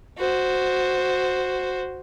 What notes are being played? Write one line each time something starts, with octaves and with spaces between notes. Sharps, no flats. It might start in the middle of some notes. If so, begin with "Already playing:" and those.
F#4 C5